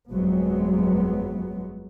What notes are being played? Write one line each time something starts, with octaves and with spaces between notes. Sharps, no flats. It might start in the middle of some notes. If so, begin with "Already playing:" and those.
G1 F2 F#3 G#3 B3